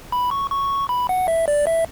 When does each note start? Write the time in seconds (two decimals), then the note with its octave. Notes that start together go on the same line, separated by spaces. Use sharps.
0.12 B5
0.31 C#6
0.51 C#6
0.89 B5
1.09 F#5
1.28 E5
1.48 D5
1.67 E5